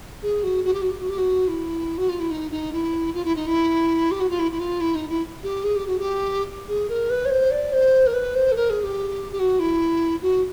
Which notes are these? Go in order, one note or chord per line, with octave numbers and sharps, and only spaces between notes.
G#4
F#4
F#4
G4
F#4
G4
F#4
G4
F#4
E4
F#4
F4
E4
D#4
D#4
E4
F4
E4
D#4
E4
G4
F#4
F4
E4
E4
F4
E4
D#4
E4
G4
G#4
G4
F#4
G4
G#4
A#4
B4
C#5
C5
D5
C5
A#4
B4
C5
A4
A#4
G#4
G4
G4
F#4
E4
F#4